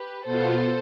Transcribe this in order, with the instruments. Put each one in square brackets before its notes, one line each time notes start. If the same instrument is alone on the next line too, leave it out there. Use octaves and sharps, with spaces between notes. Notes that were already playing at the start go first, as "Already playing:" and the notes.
Already playing: [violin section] G4 B4
[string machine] B2 B3 F4 [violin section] A4 C5